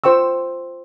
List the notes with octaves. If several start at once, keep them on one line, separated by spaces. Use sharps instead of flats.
F4 C5 G5 C#6 E6